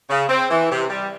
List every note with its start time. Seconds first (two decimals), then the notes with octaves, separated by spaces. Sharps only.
0.10 C#3
0.29 C4
0.50 E3
0.72 C3
0.90 G3